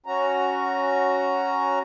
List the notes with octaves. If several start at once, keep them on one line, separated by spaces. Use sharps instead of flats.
C#4 F#4 A#5